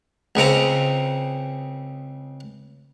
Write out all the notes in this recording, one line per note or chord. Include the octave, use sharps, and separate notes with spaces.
C#2 C#3 C4 A#5